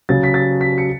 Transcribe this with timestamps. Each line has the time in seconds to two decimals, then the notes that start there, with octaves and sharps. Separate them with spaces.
0.09 C#3 F#3 A6
0.23 B6
0.34 A6
0.61 B6
0.78 C#7